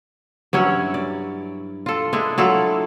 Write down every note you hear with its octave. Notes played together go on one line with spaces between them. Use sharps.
G2 F#3 C#4 E4
D5
F4 A4
G#3 D4 E4
F#3 E4 F4 A4